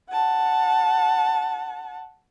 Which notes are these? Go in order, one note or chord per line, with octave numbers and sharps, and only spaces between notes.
F#5 A5